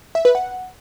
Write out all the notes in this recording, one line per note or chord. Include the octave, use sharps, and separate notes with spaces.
E5
B4
F#5